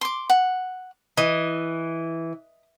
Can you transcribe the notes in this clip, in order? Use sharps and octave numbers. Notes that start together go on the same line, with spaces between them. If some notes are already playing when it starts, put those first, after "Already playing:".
C6 D6
F#5
E3 D#5